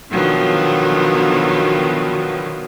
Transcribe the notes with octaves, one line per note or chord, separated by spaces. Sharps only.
B2 D3 D#3 F3 F#3 B3